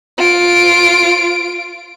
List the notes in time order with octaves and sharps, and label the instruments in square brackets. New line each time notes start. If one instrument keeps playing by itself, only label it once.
[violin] F4 D7